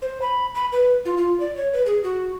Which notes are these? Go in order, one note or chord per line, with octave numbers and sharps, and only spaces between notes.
C5
B5
B5
B4
F4
F4
D5
C#5
B4
G#4
F#4